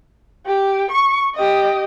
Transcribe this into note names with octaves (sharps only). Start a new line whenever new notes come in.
G4
C#6
G4 D#5